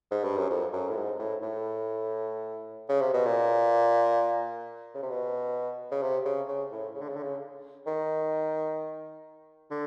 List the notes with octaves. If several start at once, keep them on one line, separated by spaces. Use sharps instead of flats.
G#2
G2
F#2
F2
F#2
A2
G#2
A2
A2
C#3
C3
B2
A#2
C#3
C3
B2
C#3
C3
C#3
C#3
A2
C#3
D3
C#3
D3
C#3
D#3
D3